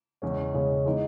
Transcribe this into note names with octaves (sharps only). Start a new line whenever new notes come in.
E2 C#3 G#3 C#4
E2 C#3 G#3 C#4
E3 G#3 B3 D#4